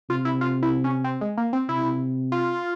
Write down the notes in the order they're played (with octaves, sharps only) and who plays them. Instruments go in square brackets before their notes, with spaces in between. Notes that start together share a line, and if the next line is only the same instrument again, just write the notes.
[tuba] C3 [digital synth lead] F4
[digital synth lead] E4
F4
E4
C#4
C4
G#3
A#3
C4
[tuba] C3 [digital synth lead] E4
[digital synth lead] F4